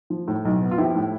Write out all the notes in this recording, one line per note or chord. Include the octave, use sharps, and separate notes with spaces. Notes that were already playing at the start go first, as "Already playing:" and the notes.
F3
A2
B1
B3
F4
F3 E4 G4
A2